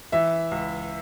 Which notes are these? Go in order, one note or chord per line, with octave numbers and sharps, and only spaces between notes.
E3 E5
C#2